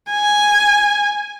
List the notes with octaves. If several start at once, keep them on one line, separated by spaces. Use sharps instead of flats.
G#5